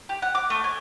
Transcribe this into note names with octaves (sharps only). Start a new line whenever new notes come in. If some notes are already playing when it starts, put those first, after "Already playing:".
G4
F#5
D6
A3
G#5